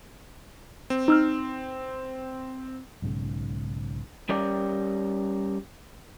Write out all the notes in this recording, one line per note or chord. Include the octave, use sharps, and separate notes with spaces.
C4
D#4 E6 F6
B1 G#2 C#3
G3 C#4 G4 A#4 D5